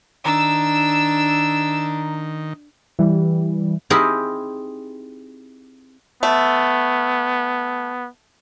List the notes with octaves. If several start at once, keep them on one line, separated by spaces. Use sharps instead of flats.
D#3 D4 A#5 E6
E3 G3
C4 D#4 E4 G4 G#4 A#4
A3 B3